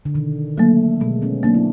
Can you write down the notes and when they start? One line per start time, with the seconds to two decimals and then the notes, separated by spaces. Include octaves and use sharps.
0.05 D3
0.14 B2 D#3
0.58 F#3 A3 A#3
1.00 B2 G#3 A#3
1.22 B3 C#4
1.43 F#3 A#3 C4 D4
1.54 E4